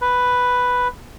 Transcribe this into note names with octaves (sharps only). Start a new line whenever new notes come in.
B4